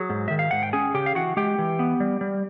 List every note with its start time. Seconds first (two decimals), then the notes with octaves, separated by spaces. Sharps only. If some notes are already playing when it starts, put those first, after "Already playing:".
Already playing: F#3 G#4
0.10 G#2
0.28 D#3 E5
0.39 F5
0.51 G#2 F#5
0.63 G5
0.73 C#4 G#4 G#5
0.94 C#3 G4 G5
1.06 F5
1.15 E3 F#4 F#5
1.37 G#3 G4 G5
1.59 E3
1.79 B3
2.00 G3
2.21 G3